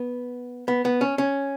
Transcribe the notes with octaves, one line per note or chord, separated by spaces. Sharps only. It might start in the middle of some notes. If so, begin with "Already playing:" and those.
Already playing: B3
B3
B3
C#4
C#4